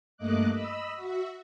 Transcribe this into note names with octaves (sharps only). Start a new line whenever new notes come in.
G2 A3 A#3 D#5 D6 F#6
D#5 B5 E6
F#4 E5